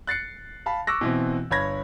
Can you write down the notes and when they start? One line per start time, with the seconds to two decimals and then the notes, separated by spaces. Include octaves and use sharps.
0.07 F#6 A6 C7 C#7
0.66 F5 A5 B5
0.87 C#6 D6 E6 F#6 A#6
1.01 B2 E3 C4
1.51 G1 C#5 B5 G#6 A#6